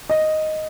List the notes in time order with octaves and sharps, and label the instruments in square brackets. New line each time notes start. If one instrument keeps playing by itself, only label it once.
[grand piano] D#5